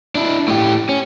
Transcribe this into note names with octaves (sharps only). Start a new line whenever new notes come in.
D4 E4
A2 G4
C#4